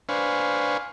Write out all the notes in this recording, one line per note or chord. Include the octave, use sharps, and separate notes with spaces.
D4 B4 C5 F5 G#5 C#6